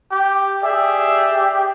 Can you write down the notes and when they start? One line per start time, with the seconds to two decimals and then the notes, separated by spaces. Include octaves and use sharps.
0.11 G4
0.63 G4 G#4 D5 E5